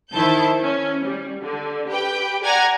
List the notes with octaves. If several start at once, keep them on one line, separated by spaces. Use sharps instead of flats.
D#3 E4 C5 A5 G6
C#4
G3
D3
G4 B4 G5
D5 F#5 G#5 A#5 G#6 A#6